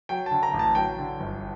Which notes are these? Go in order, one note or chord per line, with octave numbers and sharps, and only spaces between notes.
F#3 G5
D3 A5
A#5
A1
A5
F#3 G5
D3
G1